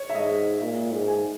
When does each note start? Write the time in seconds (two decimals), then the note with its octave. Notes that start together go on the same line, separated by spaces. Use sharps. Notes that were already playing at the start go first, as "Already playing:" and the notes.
Already playing: C#5
0.09 E5
0.15 G#2 D#5
0.38 D#5
0.61 A#2 E5
0.92 G#2
1.08 G#5